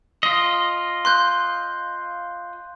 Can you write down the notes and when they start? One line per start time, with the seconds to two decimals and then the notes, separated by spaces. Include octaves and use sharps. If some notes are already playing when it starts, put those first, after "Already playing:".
0.23 F4 D#5
1.05 C6 F#6 G6